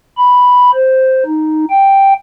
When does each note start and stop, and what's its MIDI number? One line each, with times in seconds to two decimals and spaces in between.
0.17 0.71 83
0.74 1.24 72
1.26 1.65 63
1.70 2.13 79